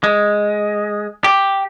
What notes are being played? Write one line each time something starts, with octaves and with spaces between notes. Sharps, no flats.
G#3
G4